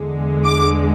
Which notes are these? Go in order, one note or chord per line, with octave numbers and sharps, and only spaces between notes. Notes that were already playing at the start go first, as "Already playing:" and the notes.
Already playing: E2 D3 G#3
D6